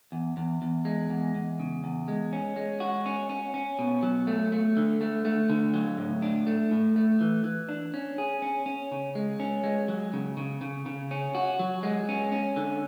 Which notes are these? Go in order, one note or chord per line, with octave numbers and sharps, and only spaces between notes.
E2
E2
E2
G#3
E2
E2
C#3
E2
G#3
C#4
G#3
F#4
C#4
C#4
C#4
B2
F#3
A3
A3
D3
A3
A3
D3
F#3
A2
D4
A3
A2
A3
E3
E3
D4
C#4
G#4
C#4
C#4
C#3
G#3
C#4
G#3
F#3
C#3
C#3
C#3
C#3
C#4
F#4
F#3
G#3
C#4
C#4
D3